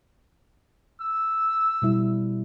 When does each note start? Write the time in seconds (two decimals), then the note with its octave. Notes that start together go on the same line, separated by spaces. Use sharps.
1.01 E6
1.82 B2 G3 E4